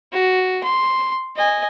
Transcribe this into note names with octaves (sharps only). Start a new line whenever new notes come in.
F#4
C6
D#5 G#5